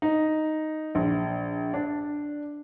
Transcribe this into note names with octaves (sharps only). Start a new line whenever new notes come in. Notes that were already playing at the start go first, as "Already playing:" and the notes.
D#4
A#1
D4